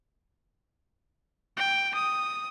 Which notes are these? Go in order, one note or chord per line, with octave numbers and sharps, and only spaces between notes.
G5
D#6